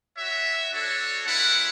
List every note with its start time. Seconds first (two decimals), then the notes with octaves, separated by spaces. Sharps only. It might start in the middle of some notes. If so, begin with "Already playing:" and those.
0.17 F#4 C#5 E5
0.71 D4 F#4 A4 C#5
1.26 G#3 C#4 E4 B4 F#5